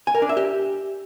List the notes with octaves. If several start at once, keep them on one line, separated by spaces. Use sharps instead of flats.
G#5
A#4
D4
E5
G4